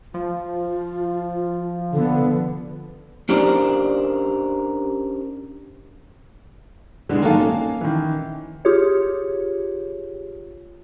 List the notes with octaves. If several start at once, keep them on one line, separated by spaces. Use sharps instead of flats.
F3 F4
D3 B3 A4
C#4 D4 G4 A#4 C5 D5
B2 D3 E3 G#3 B3
D#3 F#3 A#3 A4 F5
C#4
D#3 E3
F4 G4 G#4 C#5